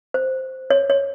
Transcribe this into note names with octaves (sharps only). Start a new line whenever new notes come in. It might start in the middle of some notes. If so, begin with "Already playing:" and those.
C5
C#5
C#5